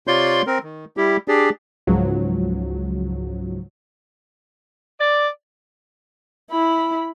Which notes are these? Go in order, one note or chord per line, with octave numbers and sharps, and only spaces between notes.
C3 F4 C#5 D5 C6 G6
C4 A#4
D#3
G3 E4 G4
D4 G4 G#4 D5
C#2 G#2 F3 F#3
D5
E4 B5